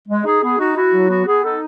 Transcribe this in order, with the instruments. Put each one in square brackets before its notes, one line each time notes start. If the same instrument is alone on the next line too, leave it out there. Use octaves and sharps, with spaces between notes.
[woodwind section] G#3
D#4 G#4
B3 G#4
D#4 F#4
E4 F#4
F#3
B3 F#4
B3 G#4
D#4 A4